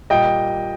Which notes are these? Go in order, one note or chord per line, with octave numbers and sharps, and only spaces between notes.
A#2 G3 D#5 G5